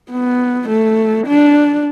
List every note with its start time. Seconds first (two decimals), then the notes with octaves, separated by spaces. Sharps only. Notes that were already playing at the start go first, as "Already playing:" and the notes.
0.11 B3
0.69 A3
1.27 D4